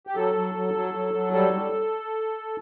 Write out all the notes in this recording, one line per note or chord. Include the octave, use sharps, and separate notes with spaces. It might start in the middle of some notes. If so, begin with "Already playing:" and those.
G4
F#3 A4
F#3
F#3
F#3
F#3
F#3
G3 A4
G3